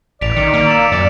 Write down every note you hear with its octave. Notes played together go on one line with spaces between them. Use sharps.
A1 D5 B6 D7 F7
D#3 D6 C#7
A#3
E6 A6 E7
F#2 D5